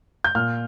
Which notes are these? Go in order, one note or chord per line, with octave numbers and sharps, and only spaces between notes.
G6
A#2 F6